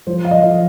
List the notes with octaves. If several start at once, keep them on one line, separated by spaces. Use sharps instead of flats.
F3 C5
F5
D#5
F3